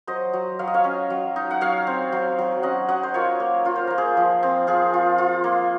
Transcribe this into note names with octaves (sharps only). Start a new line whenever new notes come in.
F#3 C5 D#5
F#3
F#3 F5
D#5
C#5 F5
C#4
F#3
D#4
F#5
F#3 C#5 F5
C4
F#3
F#3
C#4 D#5 F#5
F#3 D#5 F#5
C5
F4 A#4 C#5
A#3
F4 C#5
C5
A#3 A#4
G#4 C5
F3
C4
C4 F4 G#4
F4
F4
A#3